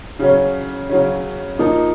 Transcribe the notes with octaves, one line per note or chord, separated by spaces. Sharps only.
C#3 F#3 C#4
C#3 F#3 C#4
F3 A#3 D#4